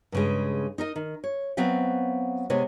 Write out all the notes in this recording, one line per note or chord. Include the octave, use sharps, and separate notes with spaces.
G2 C#3 G#3
D#4 A#4 D#5
D#3
C#5
F#3 B3 C4 E5 F5
C3 G#3 B3 C#5